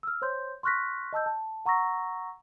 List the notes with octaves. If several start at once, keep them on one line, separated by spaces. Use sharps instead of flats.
E6 F6
C5 C#5 C6 G6
C6 C#6 F6 F#6 A#6 B6
D#5 A5 E6 G6
A5
F#5 A#5 C#6 E6 A#6